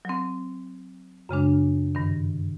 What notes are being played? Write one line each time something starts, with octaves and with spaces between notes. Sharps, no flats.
F#3 C4
F#2 C#3 G#3 D4
G2 C3 D#3